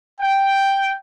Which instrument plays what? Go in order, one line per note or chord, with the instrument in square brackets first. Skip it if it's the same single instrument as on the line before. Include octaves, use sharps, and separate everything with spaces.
[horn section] G5